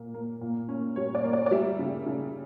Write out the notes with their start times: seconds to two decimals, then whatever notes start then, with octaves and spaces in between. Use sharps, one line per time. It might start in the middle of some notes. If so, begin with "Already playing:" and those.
Already playing: A#2 A#3
0.14 A#3
0.41 A#2
0.69 C#4
0.96 G3 C#5
1.15 D5
1.24 A#3
1.33 D5
1.46 D5
1.51 G3 E5
1.79 C#3
2.06 C#3